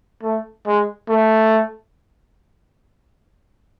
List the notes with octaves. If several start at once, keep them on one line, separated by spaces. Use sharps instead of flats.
A3
G#3
A3